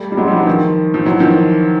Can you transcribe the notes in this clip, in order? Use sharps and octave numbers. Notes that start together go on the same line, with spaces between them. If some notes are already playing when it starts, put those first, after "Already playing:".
Already playing: G3 A3
G3
F#3 G#3
F3 G3
E3 F#3
D#3 F3
F3
E3 F#3
D#3 F3